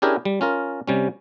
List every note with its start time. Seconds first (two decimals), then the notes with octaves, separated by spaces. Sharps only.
0.02 C#4 D4 E4 G4 G#4 A#4
0.25 G3
0.41 C#4 F4 A#4
0.88 C3 G3 C#4